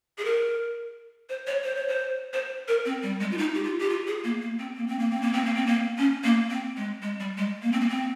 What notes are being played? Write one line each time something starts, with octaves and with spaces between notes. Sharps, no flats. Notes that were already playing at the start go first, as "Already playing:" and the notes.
G#4
A#4
C5
C#5
C5
C#5
C5
C5
A#4
C4
G3
G#3
F4
D#4
G4
F4
G4
F4
G#4
A#3
A#3
C4
A#3
C4
A#3
C4
A#3
C4
A#3
C4
A#3
C#4
A#3
C4
G#3
G#3
G3
G#3
A#3
C4
A#3
C4